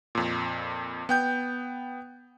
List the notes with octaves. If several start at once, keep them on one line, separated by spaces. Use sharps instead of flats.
F2 A#2
B3 G5 G6